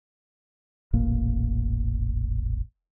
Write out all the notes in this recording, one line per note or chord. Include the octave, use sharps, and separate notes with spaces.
E1 A1 A#2 A#3